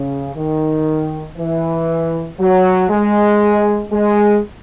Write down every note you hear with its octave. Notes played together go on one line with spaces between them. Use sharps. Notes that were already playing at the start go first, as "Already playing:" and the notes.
Already playing: C#3
D#3
E3
F#3
G#3
G#3